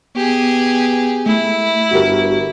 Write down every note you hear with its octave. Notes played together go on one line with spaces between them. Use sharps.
B3 G4 G#4
A3 E4
G1 F#4 G4 A#4